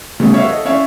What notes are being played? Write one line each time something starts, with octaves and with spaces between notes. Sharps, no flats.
C#3 G3 A3 B3
F#4 C#5 E5 F5
A4 D#5
C#4 C#5 D5 E5 F5